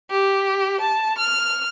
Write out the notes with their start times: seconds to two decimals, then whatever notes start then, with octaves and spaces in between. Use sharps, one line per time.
0.10 G4
0.80 A5
1.18 F6